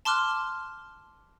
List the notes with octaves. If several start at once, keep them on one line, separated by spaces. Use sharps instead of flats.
A5 C6 D6 F6 F#6